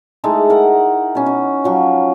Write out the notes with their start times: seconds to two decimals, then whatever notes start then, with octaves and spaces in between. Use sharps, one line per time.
0.24 G#3 A3 D#4 E4
0.50 A#4 F#5
1.15 B2 C#4
1.26 C#4
1.64 F3 F#3 C#6